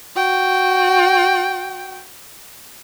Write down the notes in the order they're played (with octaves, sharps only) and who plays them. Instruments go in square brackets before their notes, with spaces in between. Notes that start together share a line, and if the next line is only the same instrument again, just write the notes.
[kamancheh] F#4 G5